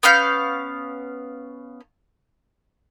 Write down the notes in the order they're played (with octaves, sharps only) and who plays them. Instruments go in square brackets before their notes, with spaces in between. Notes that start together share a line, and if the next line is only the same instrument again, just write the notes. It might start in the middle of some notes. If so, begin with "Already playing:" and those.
[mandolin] B3 C#4 F5 G6